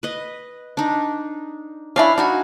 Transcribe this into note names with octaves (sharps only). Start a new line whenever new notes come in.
B4 D#5
D4 D#4
C#4 D4 E4 F5
D4 D#4 F#4 G#5